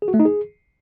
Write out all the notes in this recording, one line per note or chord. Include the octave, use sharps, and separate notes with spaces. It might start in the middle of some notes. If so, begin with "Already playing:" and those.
G#4
F#4
A3
D#4
G#4